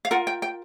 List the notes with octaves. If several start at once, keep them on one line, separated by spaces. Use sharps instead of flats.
F5
F4 A#4 F#5
G5
G5